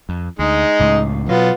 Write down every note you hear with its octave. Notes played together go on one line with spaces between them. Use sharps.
F2
D2 G#3 D#4
C#2 A2
B2 F#3 B3 F4